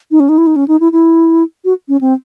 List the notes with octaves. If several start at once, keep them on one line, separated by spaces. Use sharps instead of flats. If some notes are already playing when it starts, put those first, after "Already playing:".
D#4
C#4
D#4
E4
D#4
C#4
D#4
E4
E4
F#4
C#4
C4